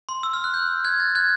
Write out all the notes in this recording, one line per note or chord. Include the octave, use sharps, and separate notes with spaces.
C6
E6
F6
F#6
G6
F#6 G#6
G6 A6
F#6 G#6